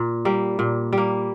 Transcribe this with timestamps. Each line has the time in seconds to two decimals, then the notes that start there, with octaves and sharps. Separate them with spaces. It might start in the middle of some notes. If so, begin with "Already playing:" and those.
Already playing: A#2
0.25 G3 A#3
0.59 A#2
0.93 G3 A#3